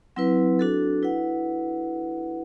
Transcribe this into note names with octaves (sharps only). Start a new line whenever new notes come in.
F#3 C4 E4 B4
D4 F#4 A4
E4 B4 F#5